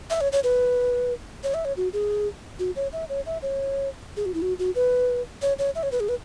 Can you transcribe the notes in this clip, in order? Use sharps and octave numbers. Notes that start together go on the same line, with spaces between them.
E5
C#5
C#5
B4
C#5
E5
C#5
F#4
G#4
F#4
C#5
E5
C#5
E5
C#5
G#4
F#4
E4
F#4
F#4
B4
C#5
C#5
E5
C#5
B4
G#4
B4